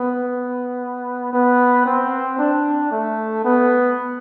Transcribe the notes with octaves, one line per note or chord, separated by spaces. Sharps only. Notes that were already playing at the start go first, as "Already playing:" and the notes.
Already playing: B3
B3
C4
D4
A3
B3